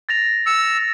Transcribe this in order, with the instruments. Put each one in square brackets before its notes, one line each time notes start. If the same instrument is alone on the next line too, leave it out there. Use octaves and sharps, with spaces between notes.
[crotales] A6 A#6 F7
[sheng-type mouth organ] E6 [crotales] C#7